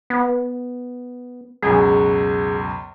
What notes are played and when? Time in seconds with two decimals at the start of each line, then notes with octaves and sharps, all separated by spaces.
0.10 B3
1.62 C#2 F#2 B2 G#4